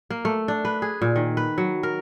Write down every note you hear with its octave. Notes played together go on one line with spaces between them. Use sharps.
A#3
A3
D4
B4
G#4
A#2
D#3
B4
F#3
A#4